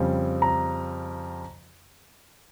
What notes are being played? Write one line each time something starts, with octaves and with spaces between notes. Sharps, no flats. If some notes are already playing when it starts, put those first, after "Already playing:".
Already playing: F2 C#3 G3 C4
A#5